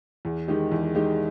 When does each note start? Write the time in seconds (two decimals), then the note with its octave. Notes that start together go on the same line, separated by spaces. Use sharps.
0.25 E2
0.48 D#3 G#3 D#4 G4
0.72 E2
0.95 D#3 G#3 D#4 G4